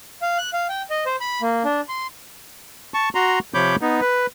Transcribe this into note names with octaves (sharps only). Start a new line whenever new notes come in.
F5
F#6
F5
G5
D#5
C5
B5
A#3
D4
C6
A5 C#6
F#4 A#5 C6
C3 F3 C#5 B5 D6 G6
B3 D#4
B4